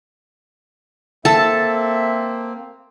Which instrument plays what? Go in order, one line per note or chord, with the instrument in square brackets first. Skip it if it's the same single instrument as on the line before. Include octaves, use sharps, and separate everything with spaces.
[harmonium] A#3 C4 [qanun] A4 A5 [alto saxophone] E5